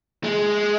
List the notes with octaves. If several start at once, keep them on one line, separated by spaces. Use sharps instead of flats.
G#3